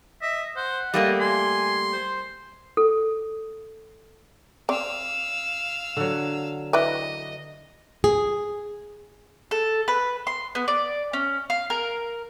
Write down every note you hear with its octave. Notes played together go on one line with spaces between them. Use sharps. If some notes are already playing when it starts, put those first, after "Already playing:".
D#5 E5
C5 F#5
G3 A3 A#3 D#5
G#5 C6
C5
A4
C4 D5 F5 E6
D3 F#3
E4 B4 D5 D#5
G#4
A4
B4
C6
B3
D5
C#4
F5
A#4